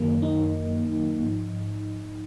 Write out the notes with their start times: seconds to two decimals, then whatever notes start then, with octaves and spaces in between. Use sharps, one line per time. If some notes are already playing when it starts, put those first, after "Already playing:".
Already playing: F#2 D#3 F#3 A#3
0.22 D#4
1.21 G#2 F3